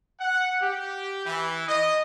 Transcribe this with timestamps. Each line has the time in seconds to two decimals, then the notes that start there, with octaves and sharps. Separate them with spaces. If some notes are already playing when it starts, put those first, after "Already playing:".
0.20 F#5
0.61 G4
1.26 E3
1.68 D#5